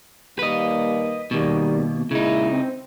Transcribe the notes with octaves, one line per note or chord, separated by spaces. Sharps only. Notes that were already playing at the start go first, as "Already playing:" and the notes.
D#2 G3 A#3 B4 D#5
D#2 B2 D#3 G3
A#2 C#3 G#3 D#4 E4
C4